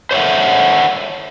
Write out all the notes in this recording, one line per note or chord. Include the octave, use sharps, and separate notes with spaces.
C5 C#5 E5 F#5